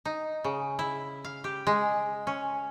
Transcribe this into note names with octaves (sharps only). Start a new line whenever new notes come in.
D#4
C#3
E4
F5
G4
G#3
C#4